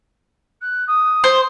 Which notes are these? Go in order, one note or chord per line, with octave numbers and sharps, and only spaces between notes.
F#6
D#6
C5